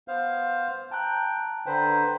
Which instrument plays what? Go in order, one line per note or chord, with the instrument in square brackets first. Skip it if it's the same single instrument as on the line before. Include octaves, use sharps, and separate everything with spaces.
[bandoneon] B3 C5 F5
[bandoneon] G5 [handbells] A5 A#5 F#6
[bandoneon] D3 B4 C5 [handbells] G5 A#5